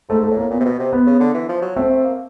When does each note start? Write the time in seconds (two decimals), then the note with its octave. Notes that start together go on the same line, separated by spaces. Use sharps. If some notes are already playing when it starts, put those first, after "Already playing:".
0.09 G#2 A3
0.23 A3
0.31 A2
0.37 A#3
0.50 A#2 B3
0.60 C3
0.65 B2
0.79 C3
0.93 B3
1.06 C#3
1.20 D3
1.34 E3
1.49 F3
1.61 F#3
1.76 A3 C4
1.90 A3
2.04 A#3